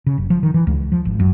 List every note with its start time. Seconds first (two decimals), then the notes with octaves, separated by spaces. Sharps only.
0.06 C#3
0.18 F#1
0.30 F3
0.43 D#3
0.54 E3
0.67 C#2
0.92 F3
1.05 G#1
1.20 F#2